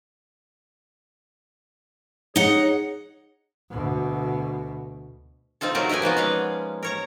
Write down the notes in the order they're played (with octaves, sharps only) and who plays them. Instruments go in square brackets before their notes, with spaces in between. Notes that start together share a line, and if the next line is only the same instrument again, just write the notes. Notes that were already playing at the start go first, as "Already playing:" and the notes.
[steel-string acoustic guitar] D#4 F#5 [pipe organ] G#4 C#5
[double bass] D2 B2
[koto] C4 D#4 F4 A4
C3 F#3 A3 A#3 A#4
D#4 A#4 B4 G5 G#5
F3 A#3 B3 F#4
G#3 C#4 F5
A#4 C#5 A#5